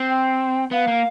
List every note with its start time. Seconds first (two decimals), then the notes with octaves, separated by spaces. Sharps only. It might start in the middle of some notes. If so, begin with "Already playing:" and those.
Already playing: C4
0.08 G5
0.71 B3 F5
0.88 A#3